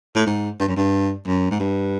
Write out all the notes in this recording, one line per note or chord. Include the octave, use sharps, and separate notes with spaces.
A2
G#2
G2
F#2
G2
F#2
G#2
G2